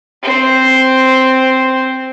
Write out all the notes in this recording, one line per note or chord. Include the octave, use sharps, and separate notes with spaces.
C4 C5